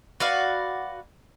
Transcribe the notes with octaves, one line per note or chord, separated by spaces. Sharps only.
F#4 B4 D5 F5